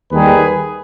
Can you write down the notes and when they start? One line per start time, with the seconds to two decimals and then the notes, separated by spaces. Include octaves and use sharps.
0.12 D#2 D#3 G3 G#4 B4